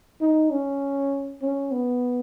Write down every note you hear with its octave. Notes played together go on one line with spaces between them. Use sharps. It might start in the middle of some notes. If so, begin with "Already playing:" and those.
D#4
C#4
C#4
B3